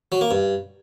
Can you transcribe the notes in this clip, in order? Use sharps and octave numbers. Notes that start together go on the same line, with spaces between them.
F#3
A#3
G2